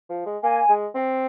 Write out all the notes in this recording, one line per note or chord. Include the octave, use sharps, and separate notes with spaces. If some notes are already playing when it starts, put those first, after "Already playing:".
F3
G#3
A#3 G#5
G#3
C4